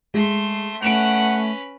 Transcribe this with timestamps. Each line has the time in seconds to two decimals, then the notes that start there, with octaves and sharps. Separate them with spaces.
0.14 G#3 A3 C6
0.82 A3 C#4 B4 F#5 D7 E7 F7